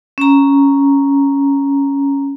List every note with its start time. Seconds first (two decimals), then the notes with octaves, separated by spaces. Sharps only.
0.18 C#4 A#5